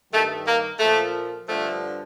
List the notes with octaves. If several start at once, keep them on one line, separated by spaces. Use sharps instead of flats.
G2 D#3 A3
A#3
A#2 F3 A3
G2 D3 F3 A3